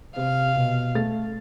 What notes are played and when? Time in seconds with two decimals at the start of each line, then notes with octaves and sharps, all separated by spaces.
0.16 C3 F5
0.56 B2
0.95 A3 A6